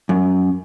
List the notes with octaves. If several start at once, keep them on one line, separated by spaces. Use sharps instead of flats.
F#2